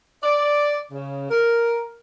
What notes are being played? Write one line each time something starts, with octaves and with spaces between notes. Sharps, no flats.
D5
C#3
A#4